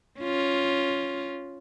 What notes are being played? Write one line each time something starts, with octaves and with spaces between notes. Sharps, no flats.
C#4 F4